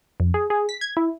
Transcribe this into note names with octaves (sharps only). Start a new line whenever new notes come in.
F2
G#4
G#4
B6
G#6
E4